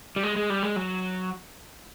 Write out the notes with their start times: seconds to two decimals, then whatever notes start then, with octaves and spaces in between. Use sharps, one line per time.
0.16 G3
0.23 G#3
0.36 G#3
0.50 G3
0.63 G#3
0.76 F#3